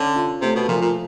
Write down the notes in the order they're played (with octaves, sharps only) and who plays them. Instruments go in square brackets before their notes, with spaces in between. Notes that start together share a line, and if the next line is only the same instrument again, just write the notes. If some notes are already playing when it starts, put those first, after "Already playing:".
Already playing: [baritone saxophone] D3 [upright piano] C#4
[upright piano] F4
[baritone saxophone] C3 [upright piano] A3
[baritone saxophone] B2
[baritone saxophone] A#2 [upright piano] F3
[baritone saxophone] A#2